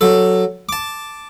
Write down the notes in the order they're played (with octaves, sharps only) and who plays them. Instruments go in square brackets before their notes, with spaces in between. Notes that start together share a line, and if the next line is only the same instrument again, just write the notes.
[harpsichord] F#3 A4
A5 D6